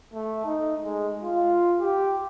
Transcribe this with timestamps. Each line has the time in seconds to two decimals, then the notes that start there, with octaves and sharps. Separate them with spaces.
0.14 A3
0.45 D#4
0.81 G#3
1.23 F4
1.80 G4